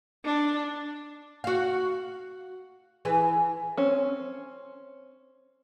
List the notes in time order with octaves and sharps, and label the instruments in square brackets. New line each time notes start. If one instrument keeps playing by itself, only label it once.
[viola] D4
[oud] F#4 F5
E3 G#4 B4
[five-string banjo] C4 C#4